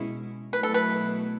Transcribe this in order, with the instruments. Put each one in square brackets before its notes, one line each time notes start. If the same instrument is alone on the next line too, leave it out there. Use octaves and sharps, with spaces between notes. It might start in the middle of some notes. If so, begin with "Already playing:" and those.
Already playing: [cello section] B2 G#3 C#4 E4
[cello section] B2 F#3 A3 E4 [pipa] B4
[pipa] A4
B4